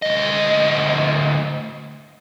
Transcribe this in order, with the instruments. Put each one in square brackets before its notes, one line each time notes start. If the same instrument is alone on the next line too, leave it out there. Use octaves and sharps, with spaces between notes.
[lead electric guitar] D2 D#5